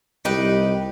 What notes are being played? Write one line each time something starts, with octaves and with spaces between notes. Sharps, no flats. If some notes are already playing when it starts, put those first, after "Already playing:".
C2 D#4 G4 B4